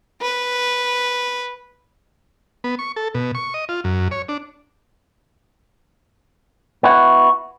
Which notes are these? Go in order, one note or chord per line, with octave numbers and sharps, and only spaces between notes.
B4
B3
C#6
A4
B2
C#6
D#5
F4
F#2
C#5
D4
B3 E4 F#4